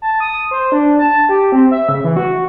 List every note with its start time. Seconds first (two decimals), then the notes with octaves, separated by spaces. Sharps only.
0.02 A5
0.20 D#6
0.51 C5
0.72 D4
0.99 A5
1.29 G4
1.52 C4
1.71 E5
1.89 C#3
2.04 E3
2.17 F#4